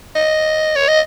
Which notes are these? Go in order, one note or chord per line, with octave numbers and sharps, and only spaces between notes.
D#5
C#5
D#5